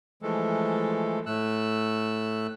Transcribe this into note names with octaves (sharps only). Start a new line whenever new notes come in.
E3 F3 G#3 A3 A4
A2 A3 E6 F#6